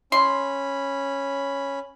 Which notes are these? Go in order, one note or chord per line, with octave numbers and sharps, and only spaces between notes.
C#4 B5 C6